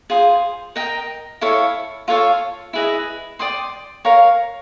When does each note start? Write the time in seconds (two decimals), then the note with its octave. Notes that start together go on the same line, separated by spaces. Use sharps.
0.10 F4 G#4 C5
0.76 A#4 D#5 G5 A#5
1.41 E4 A4 C#5 F5
2.08 F4 A4 C#5 F5
2.73 E4 G#4 B4 D#5
3.39 D5 G5 C6 D#6
4.05 A#4 C#5 F5 A#5